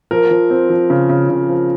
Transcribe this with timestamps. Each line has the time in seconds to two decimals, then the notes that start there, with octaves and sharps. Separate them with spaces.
0.11 F3 A#4
0.31 F3
0.50 C4
0.70 F3
0.90 C#3
1.09 C#3
1.29 C#3
1.49 F3